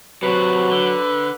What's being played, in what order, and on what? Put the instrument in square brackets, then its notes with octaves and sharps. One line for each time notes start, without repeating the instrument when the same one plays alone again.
[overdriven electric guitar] C3 F#4 [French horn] F#3 [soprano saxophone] B4
[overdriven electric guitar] D3